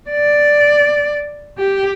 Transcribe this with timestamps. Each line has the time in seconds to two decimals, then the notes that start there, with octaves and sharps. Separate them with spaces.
0.10 D5
1.59 G4